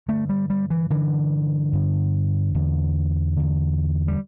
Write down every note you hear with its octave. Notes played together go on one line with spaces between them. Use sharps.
G2 D3 A3
G3
G3
E3
G2 D3 E3
G2 D3
E2 D3
E2 D3
G3